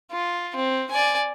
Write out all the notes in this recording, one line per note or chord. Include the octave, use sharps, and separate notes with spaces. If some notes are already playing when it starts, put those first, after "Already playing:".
F4
C4
D5 G#5